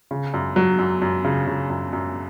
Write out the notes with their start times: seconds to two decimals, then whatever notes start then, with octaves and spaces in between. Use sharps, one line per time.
0.11 C#3
0.34 F#2
0.56 F#3
0.79 F#2
1.02 F#2
1.25 C#3
1.47 C#3
1.70 F#2
1.93 F#2